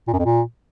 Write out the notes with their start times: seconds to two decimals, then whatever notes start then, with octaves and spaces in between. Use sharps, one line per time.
0.08 A#2
0.13 F#2
0.19 F2
0.25 A#2